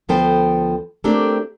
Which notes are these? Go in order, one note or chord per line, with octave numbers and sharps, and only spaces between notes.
D2 F3 B3 A4 C5 G5
A3 A#3 C4 D4 G4 A4